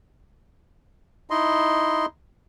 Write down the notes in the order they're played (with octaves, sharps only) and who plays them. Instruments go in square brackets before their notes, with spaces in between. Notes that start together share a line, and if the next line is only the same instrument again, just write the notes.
[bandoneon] D#4 E4 D#5 C6